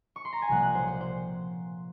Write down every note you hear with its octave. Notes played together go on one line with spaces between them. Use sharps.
C#6
C6
A#5
G#5
C2 A#2 F3 A#3 F#5
F#5
C5
C5
C5